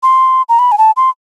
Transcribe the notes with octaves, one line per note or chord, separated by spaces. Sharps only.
C6
A#5
B5
G#5
A5
C6